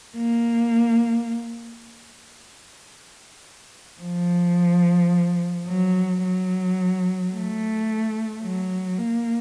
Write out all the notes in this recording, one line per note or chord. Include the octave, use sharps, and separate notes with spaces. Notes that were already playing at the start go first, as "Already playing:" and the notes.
A#3
F3
F#3
F#3
A3
F#3
A#3